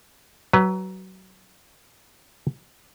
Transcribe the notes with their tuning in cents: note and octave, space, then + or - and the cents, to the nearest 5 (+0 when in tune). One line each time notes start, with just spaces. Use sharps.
F#3 +25 B4 -5